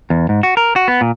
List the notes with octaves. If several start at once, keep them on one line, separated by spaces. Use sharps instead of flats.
E2
G#2
F#4
A#4
F#4
B3
A#2